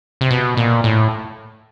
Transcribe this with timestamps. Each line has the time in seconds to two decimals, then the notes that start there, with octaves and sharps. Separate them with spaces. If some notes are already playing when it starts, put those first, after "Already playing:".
0.21 C3
0.30 B2
0.57 A#2
0.84 A2